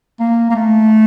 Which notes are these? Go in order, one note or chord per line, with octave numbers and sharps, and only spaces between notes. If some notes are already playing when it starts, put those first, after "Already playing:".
A#3
A#3
A3